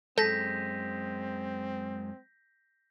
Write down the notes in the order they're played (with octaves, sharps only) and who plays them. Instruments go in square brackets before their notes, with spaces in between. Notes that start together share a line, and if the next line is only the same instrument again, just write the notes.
[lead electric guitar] F#2 G#3 [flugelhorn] C4 [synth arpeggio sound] A4 [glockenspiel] G6 A#6 B6